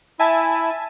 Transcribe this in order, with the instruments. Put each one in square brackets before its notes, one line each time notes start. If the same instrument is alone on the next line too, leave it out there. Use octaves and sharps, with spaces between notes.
[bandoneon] E4 [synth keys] E5 G#5 A5